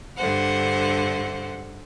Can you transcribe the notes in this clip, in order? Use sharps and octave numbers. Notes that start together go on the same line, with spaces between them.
G2 D3 C5 F#5